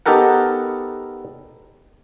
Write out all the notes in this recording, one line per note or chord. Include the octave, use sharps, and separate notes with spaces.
B3 D#4 G4 A4 A#4 F#5